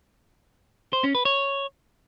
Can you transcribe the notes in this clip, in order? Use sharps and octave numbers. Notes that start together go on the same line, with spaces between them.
C5
C#4
B4
C#5